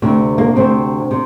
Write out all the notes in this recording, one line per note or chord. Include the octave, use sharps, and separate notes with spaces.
D2 C3
A#3
D2 C3 C4
C3